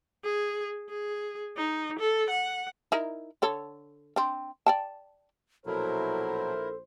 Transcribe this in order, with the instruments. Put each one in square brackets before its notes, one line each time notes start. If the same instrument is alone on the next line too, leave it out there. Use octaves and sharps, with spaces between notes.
[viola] G#4
G#4
D#4
A4
F#5
[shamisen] D#4 E4 A#4
D3 A4 C#5
C4 D4
D5 G5 A5
[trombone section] A#1 C5 [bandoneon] B2 F#3 [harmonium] E4 A#4 [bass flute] A4